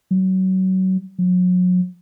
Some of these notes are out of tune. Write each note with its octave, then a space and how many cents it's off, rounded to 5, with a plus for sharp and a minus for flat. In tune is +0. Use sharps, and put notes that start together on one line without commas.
F#3 +25
F#3 -35